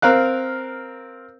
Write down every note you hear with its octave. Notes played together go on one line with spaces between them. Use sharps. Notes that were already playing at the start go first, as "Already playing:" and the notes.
C4 A#4 F5 F#6